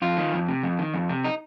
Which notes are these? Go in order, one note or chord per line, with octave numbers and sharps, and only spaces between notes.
F2 F4
D#3
F2
C3
F2
D#3
F2
C3
D#4